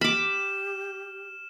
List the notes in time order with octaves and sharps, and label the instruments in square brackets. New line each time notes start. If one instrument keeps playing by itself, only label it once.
[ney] G4 [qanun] B5 D6 [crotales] F6 E7